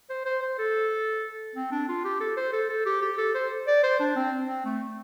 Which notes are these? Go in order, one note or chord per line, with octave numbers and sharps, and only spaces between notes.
C5
C5
C5
A4
C4
D4
F4
G4
A4
C5
A4
A4
G4
G4
A4
C5
D5
C5
D4
C4
C4
A3